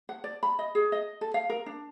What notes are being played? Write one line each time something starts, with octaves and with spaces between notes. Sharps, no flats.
F#5
D5
B5
D#5
G#4
D#5
A4
F5
A#4
D4